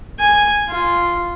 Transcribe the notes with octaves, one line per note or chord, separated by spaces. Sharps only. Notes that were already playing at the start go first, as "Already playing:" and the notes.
G#5
F4